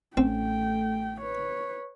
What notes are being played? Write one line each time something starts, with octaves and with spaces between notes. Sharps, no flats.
A1 A3 C4 C#4 G5
B4 C#5